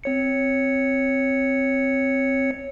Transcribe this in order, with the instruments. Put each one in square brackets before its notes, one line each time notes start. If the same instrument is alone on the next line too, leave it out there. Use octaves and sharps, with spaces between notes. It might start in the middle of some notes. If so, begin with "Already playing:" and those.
[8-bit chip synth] C4 C#5 C#7